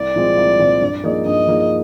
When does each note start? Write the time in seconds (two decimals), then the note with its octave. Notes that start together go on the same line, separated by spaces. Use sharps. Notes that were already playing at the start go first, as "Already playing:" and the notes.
Already playing: C2 D5
0.16 A#2 F3 G#3 C4
0.37 C2
0.59 A#2 F3 G#3 C4
0.82 G2
1.04 F3 A#3 D#4 G#4
1.26 G2 D#5
1.47 F3 A#3 D#4 G#4